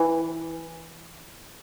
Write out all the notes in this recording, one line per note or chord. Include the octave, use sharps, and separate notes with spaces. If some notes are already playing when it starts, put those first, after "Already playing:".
Already playing: E3